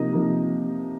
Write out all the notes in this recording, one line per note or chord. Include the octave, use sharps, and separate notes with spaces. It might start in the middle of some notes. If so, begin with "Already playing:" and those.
Already playing: C3 F3 A#3 D#4 D#5
C3 F3 A#3 D#4